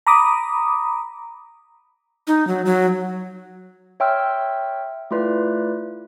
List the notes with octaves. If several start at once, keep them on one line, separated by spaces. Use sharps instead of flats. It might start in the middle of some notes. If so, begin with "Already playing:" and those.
A#5 B5 D6 D#6
D#4
F#3
F#3
C#5 E5 G5 C6 E6 F6
A3 E4 F4 B4 D5